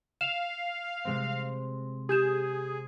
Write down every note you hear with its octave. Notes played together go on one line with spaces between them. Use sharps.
F5 E7 F7
C3 G#3 C4
G4 G#4 G6 E7